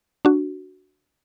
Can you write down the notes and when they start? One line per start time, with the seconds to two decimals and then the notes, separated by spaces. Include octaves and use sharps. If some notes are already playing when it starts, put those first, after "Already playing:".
0.25 D4 F#4